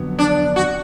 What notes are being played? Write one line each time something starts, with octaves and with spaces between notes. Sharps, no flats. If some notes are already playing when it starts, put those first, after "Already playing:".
Already playing: F2 D3 F#3 B3
D4
F#4